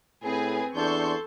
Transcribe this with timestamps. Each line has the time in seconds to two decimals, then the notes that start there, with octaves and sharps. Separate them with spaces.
0.24 A2 C4 G#4 B4 G#5
0.76 E2 D4 A4 C6 C#6 G6